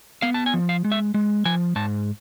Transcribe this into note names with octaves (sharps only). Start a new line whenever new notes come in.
B3 F5
A5
G#5
F3
F5
G#3
E5
G#3
F3 G#5
G#2 A5